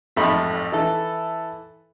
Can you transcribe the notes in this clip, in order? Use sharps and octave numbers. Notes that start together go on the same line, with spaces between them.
A1 F2 G#2 A3 D#4 B5
E3 E4 A4